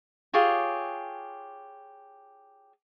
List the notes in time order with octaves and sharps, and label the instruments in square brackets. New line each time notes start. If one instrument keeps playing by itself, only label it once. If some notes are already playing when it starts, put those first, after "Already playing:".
[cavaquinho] F4 G4 G#4 C#5